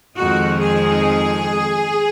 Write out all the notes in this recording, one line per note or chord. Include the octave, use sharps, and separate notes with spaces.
F2 D#3 G#3 D#4 F#4
G#4